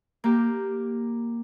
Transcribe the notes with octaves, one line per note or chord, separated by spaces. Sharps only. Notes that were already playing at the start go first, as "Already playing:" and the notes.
A#3 G4